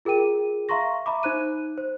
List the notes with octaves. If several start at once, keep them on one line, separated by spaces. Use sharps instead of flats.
F4 G#4 A#4 G5 D#7
E5 F5 A#5 C6 C#6 A#6
E5 A#5 B5 D6
D#4 C5 F#6 D#7
C5